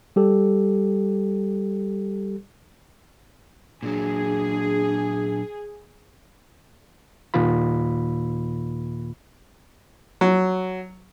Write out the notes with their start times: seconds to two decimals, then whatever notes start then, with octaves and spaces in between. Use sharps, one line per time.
0.16 G3 G4 A4
3.83 A#2 F#3 D4 G#4
7.34 D#2 A#2 D#3 A#3 F4 B5
10.21 F#3